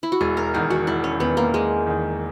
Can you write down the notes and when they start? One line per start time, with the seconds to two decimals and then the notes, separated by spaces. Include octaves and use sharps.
0.03 E4
0.12 F#4
0.21 E1 G#4
0.37 A#4
0.54 E2 D#3 G#4
0.70 F#4
0.87 E1 E4
1.04 C#4
1.20 E2 D#3 B3
1.37 A#3
1.53 E1 G#3
1.87 E2 D#3